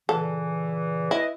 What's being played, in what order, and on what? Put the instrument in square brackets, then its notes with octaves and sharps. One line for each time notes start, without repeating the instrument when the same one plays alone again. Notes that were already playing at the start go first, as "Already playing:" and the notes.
[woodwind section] A#2 C#3 E3 [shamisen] A4
[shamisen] E4 [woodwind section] B4 D#5